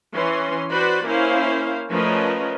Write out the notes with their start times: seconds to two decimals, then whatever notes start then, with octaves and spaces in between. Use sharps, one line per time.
0.14 E3 C#4 C6
0.70 F#4 B4 C5 D5 B5
1.06 A#3 C#4 E4 C5 F5
1.90 F3 A3 C#4 A#4 B4 D#5